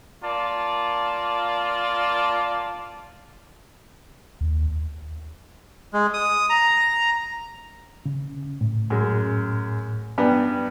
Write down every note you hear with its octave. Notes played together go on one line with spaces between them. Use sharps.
A#3 F4 D5 A5
D#2
G#3
D#6
A#5
C#3
A2
F#2 G#3
G2 G3 B3